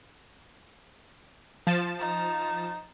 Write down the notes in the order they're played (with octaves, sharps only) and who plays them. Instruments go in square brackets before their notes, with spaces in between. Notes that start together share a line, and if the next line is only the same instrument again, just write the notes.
[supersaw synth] F3 A6 E7
[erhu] D#4